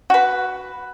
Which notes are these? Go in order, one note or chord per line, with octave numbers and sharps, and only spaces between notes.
F#4 B4